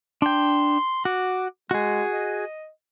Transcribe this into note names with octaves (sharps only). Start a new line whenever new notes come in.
D4 G5 C6
F#4 D6
G#3 F#4 G#4
D#5